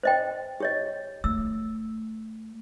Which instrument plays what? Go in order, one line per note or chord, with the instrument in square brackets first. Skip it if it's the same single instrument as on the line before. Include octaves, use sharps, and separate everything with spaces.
[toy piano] C5 D#5 G5
G4 C#5 D#5
[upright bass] A3 [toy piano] E6